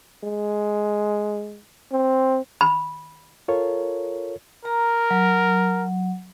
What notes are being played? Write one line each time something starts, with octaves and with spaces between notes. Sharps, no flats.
G#3
C4
B5
F4 A4 A#4 C#5
A#4 A#5
F#3